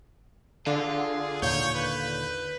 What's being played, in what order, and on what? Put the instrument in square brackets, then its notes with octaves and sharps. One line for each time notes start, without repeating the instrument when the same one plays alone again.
[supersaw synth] D3 [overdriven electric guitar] F4 [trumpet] G#4
[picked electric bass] D#2 A#2 D3 [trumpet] C#5 [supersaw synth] G6
[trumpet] B4